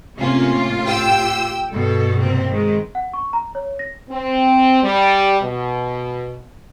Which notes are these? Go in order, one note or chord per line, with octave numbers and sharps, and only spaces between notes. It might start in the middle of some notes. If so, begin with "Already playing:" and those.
A2 C3 A#3 C#4 F4
G4 G5 E6
G2 B2 A4
C3 A#3 C4
D#3 G#3
F#5
C#6
A#5
C#5
A#6
C4
G3
B2